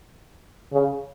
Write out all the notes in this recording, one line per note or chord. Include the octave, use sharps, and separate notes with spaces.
C#3